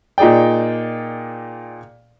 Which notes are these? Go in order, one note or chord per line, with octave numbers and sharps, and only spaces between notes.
A#2 D#4 G#4 D5 G5